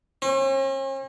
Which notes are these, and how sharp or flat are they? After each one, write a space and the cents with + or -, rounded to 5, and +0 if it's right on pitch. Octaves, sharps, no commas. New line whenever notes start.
C#4 -45